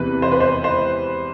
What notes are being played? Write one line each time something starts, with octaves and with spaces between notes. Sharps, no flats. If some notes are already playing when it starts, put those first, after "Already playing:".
Already playing: E2 C3 E3 B4
C5
B4
C5
C5